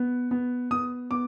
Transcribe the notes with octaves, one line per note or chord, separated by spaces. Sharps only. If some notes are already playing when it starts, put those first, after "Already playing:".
Already playing: B3
B3
B3 D#6
B3 D6